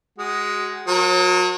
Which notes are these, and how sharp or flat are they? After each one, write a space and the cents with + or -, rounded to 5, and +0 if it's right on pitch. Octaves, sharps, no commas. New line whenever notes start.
G#3 +0 F#4 +25
F#3 -35 A#4 +20